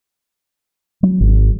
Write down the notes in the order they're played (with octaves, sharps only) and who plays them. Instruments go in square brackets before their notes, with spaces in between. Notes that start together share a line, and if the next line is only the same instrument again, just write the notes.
[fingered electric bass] F#3
G#1